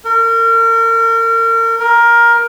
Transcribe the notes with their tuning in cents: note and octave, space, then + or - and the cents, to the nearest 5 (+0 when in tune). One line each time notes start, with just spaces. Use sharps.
A#4 -35
A#4 +15